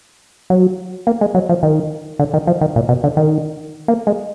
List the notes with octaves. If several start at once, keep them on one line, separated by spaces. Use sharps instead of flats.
F#3
A#3
G#3
F#3
F3
D#3
D3
D#3
F3
D#3
A#2
B2
D3
D#3
A#3
G#3